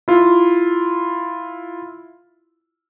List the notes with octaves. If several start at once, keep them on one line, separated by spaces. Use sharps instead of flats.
E4 F4